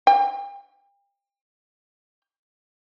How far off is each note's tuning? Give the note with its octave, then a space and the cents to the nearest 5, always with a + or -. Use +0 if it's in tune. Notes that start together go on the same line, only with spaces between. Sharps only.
G5 +35